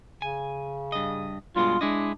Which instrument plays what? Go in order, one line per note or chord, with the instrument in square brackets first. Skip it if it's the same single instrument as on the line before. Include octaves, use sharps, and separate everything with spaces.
[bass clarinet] C#3 [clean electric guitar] G#5
[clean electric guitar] G2 D#5
[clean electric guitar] G2 B2 G#3 [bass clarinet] F4
[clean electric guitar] G#3 E4 D#5 [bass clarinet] D4